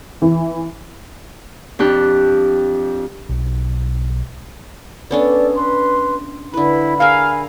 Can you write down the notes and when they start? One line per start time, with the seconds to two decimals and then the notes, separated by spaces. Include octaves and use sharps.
0.22 E3
1.79 F2 D4 G4 F#6
3.29 B1
5.11 B3 C#4 D4 A4 D5
5.55 B4 C6
6.54 D3 E4 B4 B5
7.00 G#4 A#4 E5 F5 G#5